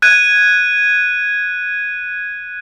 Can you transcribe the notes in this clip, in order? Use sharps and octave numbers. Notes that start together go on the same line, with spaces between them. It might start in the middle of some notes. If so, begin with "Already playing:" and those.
F#6 G#6 D#7